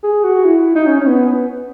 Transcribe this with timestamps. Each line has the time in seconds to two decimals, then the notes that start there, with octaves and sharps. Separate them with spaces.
0.03 G#4
0.24 F#4
0.45 E4
0.75 D#4
0.86 C#4
1.00 C#4
1.07 B3